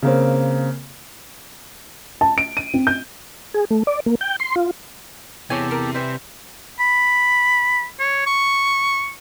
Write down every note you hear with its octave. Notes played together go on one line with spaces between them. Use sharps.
C#3 A#3 C4
A5
D7
D#7
C4
G6
G#4
A3
D5
A#3
G5
C6
F4
E2 C3 G4 A4 C#5 G#5
A#4
E3 G3 C5 E5
B5
C#5
C#6